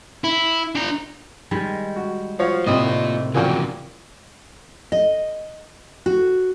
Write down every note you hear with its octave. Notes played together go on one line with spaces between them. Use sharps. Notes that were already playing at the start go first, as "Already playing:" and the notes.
E4
D4 A#5
D#3 G3 G#3
F#4
F3 F#4 C#5 F5
A2 C3 A#3 C4 F4 D#5
D#3
A#2 C#3 E3 F3 A#3 F#4 G#4 G5
D#5
F#4